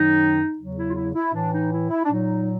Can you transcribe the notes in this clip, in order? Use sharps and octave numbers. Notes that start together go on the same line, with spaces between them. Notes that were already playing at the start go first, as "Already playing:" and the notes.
Already playing: F#2 D#3 F#3 D#4
E2 C#3 F#3
E4
F4
E4
E4
A2 E3 D4
D#4
E4
E4
D4
A#2 F#3 D#4